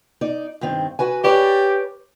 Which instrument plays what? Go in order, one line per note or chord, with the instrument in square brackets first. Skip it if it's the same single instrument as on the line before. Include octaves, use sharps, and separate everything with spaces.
[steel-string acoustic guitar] D#4 D5
G2 D#3 C4
F#4 B4 G#5
[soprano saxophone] G4 [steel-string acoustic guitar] B4 C#5 D5